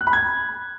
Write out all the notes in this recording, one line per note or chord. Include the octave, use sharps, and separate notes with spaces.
F#6
B5
G#6